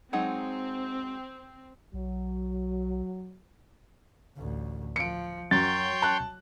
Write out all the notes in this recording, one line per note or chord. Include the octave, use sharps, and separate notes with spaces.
F#3 G#3 C4 D#4
B1 F#3
A1 D2
F3 C#7 D7
F#2 F#3 C#5 G5 C6 A6
A5 F#6